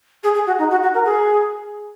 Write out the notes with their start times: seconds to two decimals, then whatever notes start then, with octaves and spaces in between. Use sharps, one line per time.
0.23 G#4
0.34 G#4
0.46 F#4
0.58 D#4
0.70 F#4
0.82 F#4
0.93 A#4
1.05 G#4